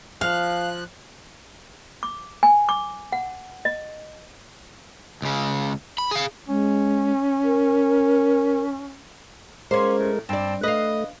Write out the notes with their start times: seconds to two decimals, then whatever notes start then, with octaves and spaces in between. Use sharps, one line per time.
0.21 F3 F5 F6 F#6
2.03 D6
2.43 G#5
2.69 D6
3.12 F#5
3.65 D#5
5.22 C#2 C#3
5.98 B5
6.11 G#4 F5
6.48 G#3 C#4
7.44 A#4
9.71 G#3 A#3 C#4 A#4 C5
9.98 A2
10.29 G2 C4 D5 A5
10.63 A3 B4 D#5 F5